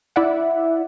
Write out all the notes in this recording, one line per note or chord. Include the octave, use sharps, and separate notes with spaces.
E4 D5 E5 F#5